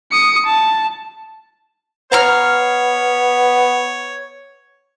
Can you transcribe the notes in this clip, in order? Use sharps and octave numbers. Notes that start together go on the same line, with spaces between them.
D#6 C#7
A5
B3 C#5 F5 A#5 F6